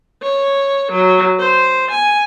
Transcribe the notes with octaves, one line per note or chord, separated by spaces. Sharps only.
C#5
F#3
C5
G#5